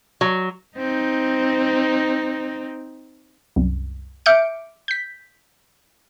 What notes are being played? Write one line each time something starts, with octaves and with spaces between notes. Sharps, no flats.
F#3
C4 D#4
C2 F#2
E5 D6 F6 G6 C#7 D7
G6 B6